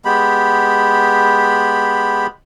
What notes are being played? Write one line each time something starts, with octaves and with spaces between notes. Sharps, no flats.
G#3 B3 G4 B5